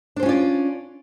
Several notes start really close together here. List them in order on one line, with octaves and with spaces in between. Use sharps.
D4 C5 C#4 F4 D5